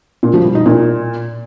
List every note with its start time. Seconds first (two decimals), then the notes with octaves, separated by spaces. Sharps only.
0.23 A#2
0.34 F3
0.44 G3
0.55 D#4
0.66 A#2